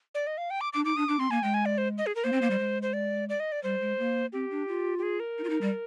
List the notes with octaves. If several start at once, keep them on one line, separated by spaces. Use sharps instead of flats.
D5
D#5
F5
G5
D6
D4 D6
D#4 D6
D4 D#6
D4 D6
C4 C6
A#3 G#5
G#3 G5
G#5
D5
C5
D#5
G#4
A#4
A#3 C5
C4
A#3
G3
G#3
C5
D5
D5
D#5
D5
G3 C5
G#3
A#3
C4 G4
D4
F4
G4
G#4
A#4
D#4
F4
D#4
G3